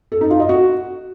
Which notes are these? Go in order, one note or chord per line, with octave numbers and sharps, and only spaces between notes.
A4
D#4
F4
D#5
F#4